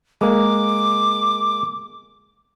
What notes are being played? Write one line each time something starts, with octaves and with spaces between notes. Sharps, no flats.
G#3 A#3 D6